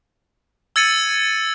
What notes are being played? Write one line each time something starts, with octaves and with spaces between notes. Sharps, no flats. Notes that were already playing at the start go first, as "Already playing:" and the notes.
E6 G#6 A6 C#7 D#7 F#7